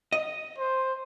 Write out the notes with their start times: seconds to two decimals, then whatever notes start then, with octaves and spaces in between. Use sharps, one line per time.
0.13 D#5
0.58 C5